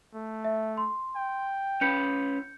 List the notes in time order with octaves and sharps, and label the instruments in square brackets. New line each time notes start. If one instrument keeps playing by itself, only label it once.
[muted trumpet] A3
[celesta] E5
C6
[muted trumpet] G5
[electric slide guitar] C#4 B4 [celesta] G6 C#7